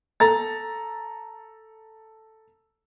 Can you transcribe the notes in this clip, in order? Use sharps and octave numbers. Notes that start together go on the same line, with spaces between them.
A4 A#5 A6